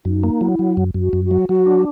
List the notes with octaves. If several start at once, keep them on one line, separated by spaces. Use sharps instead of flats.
F#2 D#4
A#3
F#3 E4
F#3
F#2
F#2
F#4
F#2
F#4
F#3
F#3 F#4
D4